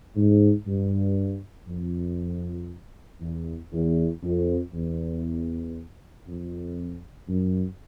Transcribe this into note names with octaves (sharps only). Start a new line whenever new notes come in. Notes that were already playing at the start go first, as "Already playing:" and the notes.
G#2
G2
F2
E2
E2
F2
E2
F2
F#2